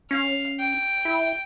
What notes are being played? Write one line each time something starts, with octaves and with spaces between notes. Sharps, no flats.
C#4 F5
G5
E4